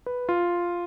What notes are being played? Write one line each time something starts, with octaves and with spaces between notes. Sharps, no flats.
B4
F4